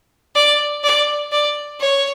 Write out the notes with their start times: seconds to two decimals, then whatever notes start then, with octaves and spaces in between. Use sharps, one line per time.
0.35 D5
0.84 D5
1.32 D5
1.80 C#5